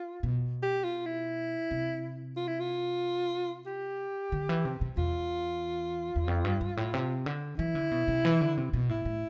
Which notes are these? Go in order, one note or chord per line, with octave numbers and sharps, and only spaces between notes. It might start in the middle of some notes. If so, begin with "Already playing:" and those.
Already playing: F4
B2
G4
F4
E4
C3
F4
E4
F4
G4
D3
E3
C3
C3
E2 F4
E2
F2
G2
G2
A2
C3
D3
E3 E4
D3
B2
C3
E3
D3
C3
B2
A2 E4
A2